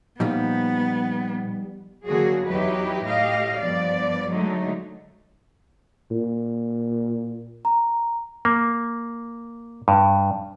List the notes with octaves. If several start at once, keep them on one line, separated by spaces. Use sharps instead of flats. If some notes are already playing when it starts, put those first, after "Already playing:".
A#2 F3 G3 B3 D#4
D3 D#3 F#3 A#3 F#4 G#4
E2 F#3 D#4 E4 G4 B4
A2 G4 D#5 F5
G2 F3 B3 D5
D3 F#3 G#3 A3 D#4
A#2
A#5
A#3
G2